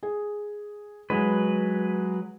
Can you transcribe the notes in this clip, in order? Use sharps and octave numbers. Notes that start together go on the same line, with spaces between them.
G#4
F#3 G#3 B4